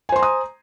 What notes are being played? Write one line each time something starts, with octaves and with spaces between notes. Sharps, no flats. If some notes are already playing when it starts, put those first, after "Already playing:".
C5 G#5 A#5 C6 D#6